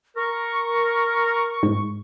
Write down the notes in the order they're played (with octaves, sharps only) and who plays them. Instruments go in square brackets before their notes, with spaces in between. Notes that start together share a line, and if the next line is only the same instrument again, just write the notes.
[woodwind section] A#4 [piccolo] C#6
[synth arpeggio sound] G#2